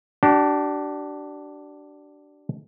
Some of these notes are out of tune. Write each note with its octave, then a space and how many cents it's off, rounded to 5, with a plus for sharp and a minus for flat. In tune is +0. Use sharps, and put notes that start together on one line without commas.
D4 +0 G4 -45